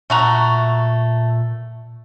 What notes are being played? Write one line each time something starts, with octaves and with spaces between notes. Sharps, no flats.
A#2 A3 F#4 A#5